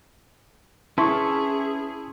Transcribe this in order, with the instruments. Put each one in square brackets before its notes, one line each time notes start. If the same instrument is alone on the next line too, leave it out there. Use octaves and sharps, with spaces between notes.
[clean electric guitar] C#4 B4 [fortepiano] E4 [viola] G#4 [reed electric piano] A5 C6 C#6